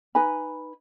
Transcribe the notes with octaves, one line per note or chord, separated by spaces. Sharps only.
D#4 B4 G#5 B5